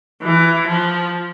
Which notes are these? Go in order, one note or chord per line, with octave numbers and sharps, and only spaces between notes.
E3
F3